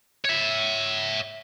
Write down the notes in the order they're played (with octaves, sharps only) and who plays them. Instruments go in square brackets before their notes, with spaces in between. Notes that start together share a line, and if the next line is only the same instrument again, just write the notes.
[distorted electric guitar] C#5 E5